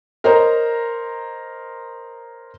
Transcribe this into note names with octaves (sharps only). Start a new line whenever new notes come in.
A#4 C5 C#5 D#5 A#5